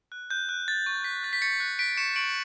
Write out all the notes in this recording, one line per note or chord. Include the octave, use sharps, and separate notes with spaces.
F#6
F#6 G6
F#6
F#6 A6
C#6
C#6 B6
F#6 A6
B6
C#6 A6 C#7
F#6
F#6 B6 D7
C#6 C#7 E7
C#6 D7 F#7